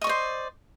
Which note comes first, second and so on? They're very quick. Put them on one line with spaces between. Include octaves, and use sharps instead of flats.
D#5 C#6 D5 C5